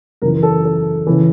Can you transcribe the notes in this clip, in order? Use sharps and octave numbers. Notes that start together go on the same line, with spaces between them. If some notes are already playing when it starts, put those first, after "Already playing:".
F#2 C#3 E3 A#4
A4
A4
C#3 E3